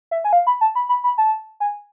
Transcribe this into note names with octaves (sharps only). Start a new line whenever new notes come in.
E5
G#5
F5
B5
A5
B5
B5
B5
A5
G#5